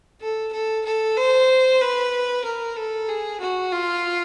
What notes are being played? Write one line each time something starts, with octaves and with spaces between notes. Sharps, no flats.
A4
A4
A4
C5
B4
A#4
A4
G#4
F#4
F4